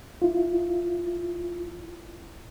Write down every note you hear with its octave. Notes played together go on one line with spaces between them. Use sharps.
E4 F4